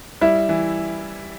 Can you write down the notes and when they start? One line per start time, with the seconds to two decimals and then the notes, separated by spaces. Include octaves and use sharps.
0.21 G3 E4
0.49 E3